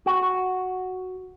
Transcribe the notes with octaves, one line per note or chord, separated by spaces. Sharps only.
F#4